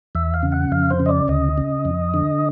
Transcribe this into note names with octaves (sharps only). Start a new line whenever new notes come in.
E2 E5
F5
C#3
F#5
F2 F5
C5
C#3
D#5
D5
D2 D#5
C#3
F2
D3